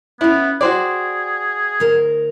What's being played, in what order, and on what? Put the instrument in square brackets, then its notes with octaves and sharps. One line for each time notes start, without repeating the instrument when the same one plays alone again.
[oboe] B3 [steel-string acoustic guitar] C#4 F4 [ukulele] E4
[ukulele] F#4 C5 D5 [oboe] G#4 [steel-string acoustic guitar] G5
[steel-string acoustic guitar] D2 A#4